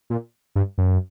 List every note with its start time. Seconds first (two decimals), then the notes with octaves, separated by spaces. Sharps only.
0.10 A#2
0.55 G2
0.78 F#2